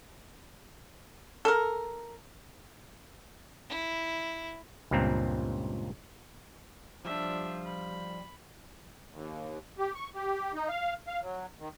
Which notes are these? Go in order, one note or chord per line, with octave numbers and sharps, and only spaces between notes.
A4 A#4
E4
C#2 G2 A#2 C4 A#5
F3 G3 D4 F4 E5
B5
D#2
G4
C#6
G4
D#4
F5
F5
F#3
D#3